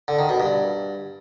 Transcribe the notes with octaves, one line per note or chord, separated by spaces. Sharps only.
D3
D#3
B2
G2